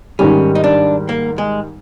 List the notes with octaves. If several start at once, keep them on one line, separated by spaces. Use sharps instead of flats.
G#2 D#3 G3 C#4
D#4
D4
A#3
G#3